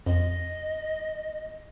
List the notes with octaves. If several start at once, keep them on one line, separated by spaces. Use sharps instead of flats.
F2 D#5